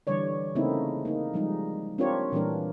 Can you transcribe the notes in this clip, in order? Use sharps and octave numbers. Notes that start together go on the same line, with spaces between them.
D3 E3 G3 C#5 D5
C#3 A3 A#3 C4 D#4 E4
A#3 D#4
F3 G3 G#3 D#4
C4 D4 F4 G4 A#4 C#5
A#2 E3 G3 A#3 D4 A#4